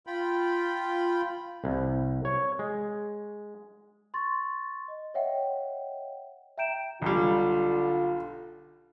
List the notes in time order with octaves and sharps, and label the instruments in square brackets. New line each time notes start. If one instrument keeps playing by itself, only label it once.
[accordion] F4 G5 B5
[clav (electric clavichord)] C2
C#5
G#3
[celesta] C6 C#6 A6
D#5
C#5 D#5 E5 F#5 G5
E5 G5 A#5 G6 D7 E7
[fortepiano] B1 G3 [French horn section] D3 F4